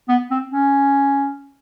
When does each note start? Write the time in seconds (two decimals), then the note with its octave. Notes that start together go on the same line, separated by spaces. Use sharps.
0.09 B3
0.31 C4
0.52 C#4